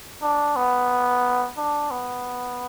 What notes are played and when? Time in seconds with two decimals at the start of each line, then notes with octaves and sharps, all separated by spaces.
0.23 D4
0.56 B3
1.57 D4
1.91 B3